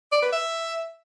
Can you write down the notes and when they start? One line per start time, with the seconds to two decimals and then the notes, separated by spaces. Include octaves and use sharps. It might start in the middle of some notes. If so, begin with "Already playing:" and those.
0.12 D5
0.22 B4
0.32 E5